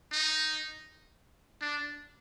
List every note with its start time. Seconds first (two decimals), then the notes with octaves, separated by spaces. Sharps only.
0.12 D#4
1.62 D4